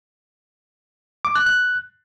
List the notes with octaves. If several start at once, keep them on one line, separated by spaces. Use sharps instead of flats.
D6
F#6
F#6